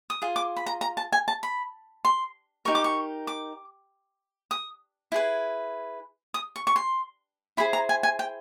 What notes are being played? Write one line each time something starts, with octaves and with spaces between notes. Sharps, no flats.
D#6
F4 G#4
D6
B5
A#5
A#5
A5
G#5
A5
B5
C6
D#4 G4 A#4 C#6
D6
C#6
D6
D#6
E4 G#4 B4
D#6
C#6
C#6
C6
E4 G#4 C5 B5
A#5
G#5
G#5
G5